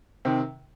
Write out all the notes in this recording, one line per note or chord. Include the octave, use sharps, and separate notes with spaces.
C3 D#3 C4